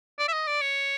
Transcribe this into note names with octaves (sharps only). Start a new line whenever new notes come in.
D5
E5
D#5
D5
C#5